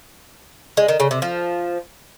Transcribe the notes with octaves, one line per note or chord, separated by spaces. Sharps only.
G#3
D#3
C#3
C3
F3